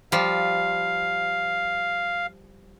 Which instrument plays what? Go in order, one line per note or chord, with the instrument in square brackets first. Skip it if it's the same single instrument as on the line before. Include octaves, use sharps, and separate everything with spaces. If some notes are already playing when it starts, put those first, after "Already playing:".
[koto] F3 G3 [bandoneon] F5